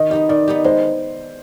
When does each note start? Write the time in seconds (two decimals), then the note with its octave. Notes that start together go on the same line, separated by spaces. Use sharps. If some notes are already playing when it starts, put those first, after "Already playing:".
Already playing: D#3 D#5
0.11 B3 D#4 G4 D#5
0.29 D#3 D5
0.48 B3 D#4 G4
0.64 G#3 C5